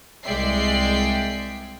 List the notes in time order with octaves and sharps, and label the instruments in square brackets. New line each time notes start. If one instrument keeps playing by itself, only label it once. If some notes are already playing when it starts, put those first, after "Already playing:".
[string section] C2 G#3 D5 E5 G5 C7